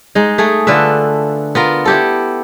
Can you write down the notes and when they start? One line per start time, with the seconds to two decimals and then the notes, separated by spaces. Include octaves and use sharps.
0.15 G#3 D#4
0.38 A3 G#4
0.67 D3 F4 B4 E5
1.55 B3 F4 A#4
1.85 E4 G4 A4